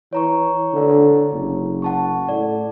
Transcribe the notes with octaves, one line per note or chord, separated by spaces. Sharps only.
E3 C#5 A#5 C#6
D3
F#1
F#5 A5 C#6
A2 D5